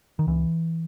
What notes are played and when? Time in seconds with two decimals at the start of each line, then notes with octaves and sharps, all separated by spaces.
0.19 D#3
0.27 C#2 E3